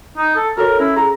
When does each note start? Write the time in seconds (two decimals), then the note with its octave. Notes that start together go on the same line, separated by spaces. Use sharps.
0.17 D#4
0.36 A4
0.57 F#4 A4 A#4 C#5
0.79 C#4 E4
0.96 G#4 A#5